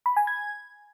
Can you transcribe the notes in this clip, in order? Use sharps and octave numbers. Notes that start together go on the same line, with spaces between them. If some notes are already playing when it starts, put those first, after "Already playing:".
B5
G#5
G#6